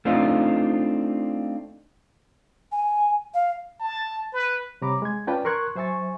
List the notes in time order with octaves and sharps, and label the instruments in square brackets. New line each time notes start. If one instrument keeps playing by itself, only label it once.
[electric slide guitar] A3 C4 D4 D#4 F4
[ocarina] G#5
F5
[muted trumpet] A5
B4
[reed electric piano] C3 G3 C#5 A#5 B5 D6
G#3 G#6
C#4 F4 B4 D5 G5 A5
A#4 C6 C#6 F#6 G#6
F#3 C5 E5 G#5 C#6 A6